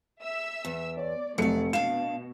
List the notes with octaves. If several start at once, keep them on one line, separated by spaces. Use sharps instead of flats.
E5 E6
E2
C#5 D5
F1 F#3 A3 A4 D5 C#7
B2 D4 F5 E7